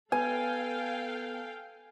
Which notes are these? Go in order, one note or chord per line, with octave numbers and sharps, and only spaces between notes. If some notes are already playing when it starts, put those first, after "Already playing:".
B3 A4 B4 F5 G5 G#5